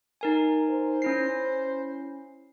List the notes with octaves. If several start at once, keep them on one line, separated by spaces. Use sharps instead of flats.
D#4 A#4 G#5
C5
C#4 E4 C7